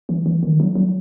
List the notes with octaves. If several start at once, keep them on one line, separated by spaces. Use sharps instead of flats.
E3
E3
D#3
F#3
F#3